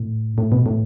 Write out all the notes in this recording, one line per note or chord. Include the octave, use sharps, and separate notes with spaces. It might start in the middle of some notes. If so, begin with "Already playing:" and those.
Already playing: A2
A2
B2
A2